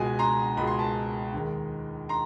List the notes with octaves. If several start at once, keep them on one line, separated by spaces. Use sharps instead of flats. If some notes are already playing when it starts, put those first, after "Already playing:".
Already playing: C#2 B2 G#3 G#5
A#5 C6
C#2 B2 G#3 B5
C6
A5 B5
D#2 D#3 G#3
A#5 C6